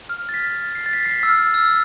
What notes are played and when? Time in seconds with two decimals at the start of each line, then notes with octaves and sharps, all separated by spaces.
0.09 F6
0.29 A6
0.34 B6
0.75 C7
0.86 A6
0.93 B6
1.06 C7
1.11 B6
1.23 E6
1.29 F6
1.54 E6